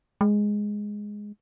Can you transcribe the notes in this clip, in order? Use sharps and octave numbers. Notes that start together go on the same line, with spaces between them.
G#3